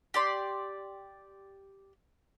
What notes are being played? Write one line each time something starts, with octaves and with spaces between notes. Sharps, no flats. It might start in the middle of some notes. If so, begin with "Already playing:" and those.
G4 D5 C6